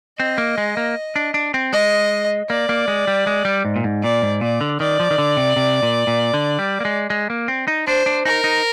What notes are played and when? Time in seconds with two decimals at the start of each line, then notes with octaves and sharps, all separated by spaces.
0.19 C4 D#5
0.38 A#3
0.58 G#3
0.77 A#3
1.16 D4
1.34 D4
1.54 C4
1.72 G#3 D#5
2.50 A#3 D5
2.69 A#3
2.88 G#3
3.07 G3
3.27 G#3
3.45 G3
3.65 G#2
3.76 A#2
3.84 G#2
4.03 A#2 D5
4.22 G#2
4.41 A#2 D5
4.61 D3
4.79 D#3 D5
5.00 F3
5.11 D#3
5.18 D3
5.37 C3
5.56 C3
5.83 A#2
6.07 A#2
6.34 D3
6.59 G3
6.80 A#3
6.85 G#3
7.10 G#3
7.30 A#3
7.48 C4
7.68 D#4
7.87 D4 C5
8.06 D4
8.25 D#4 A#4
8.44 D#4